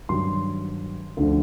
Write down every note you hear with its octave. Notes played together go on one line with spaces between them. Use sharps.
G2 D#3 F#3 C6
D2 D3 F3